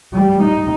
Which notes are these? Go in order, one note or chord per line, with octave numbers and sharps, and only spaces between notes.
G3
D#4